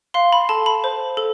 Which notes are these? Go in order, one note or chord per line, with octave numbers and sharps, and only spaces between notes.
F5 C6
B5
A4 A5
B5
C5
A4